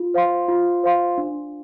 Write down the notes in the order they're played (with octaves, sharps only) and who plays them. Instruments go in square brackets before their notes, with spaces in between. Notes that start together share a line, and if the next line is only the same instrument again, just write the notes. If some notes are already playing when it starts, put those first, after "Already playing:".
Already playing: [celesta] F4
C5 F5 C6
F4
C5 F5 C6
D4